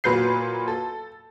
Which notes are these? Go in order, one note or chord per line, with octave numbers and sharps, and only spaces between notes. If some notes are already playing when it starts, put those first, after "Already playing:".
A#2 F#3 B4 G6 C7
A4